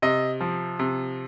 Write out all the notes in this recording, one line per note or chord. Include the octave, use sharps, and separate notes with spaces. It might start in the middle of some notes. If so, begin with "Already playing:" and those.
C3 D#5
F3
C3